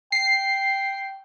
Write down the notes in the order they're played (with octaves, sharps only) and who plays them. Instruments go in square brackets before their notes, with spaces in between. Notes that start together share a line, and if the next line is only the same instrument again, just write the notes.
[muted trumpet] G5 [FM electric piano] C7